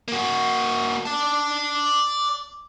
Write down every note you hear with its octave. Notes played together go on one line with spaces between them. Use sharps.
A#3 F#4
D5 A5